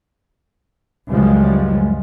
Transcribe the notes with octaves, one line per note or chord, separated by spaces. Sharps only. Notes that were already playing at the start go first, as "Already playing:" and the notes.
C#2 F#2 F3 G3 G#3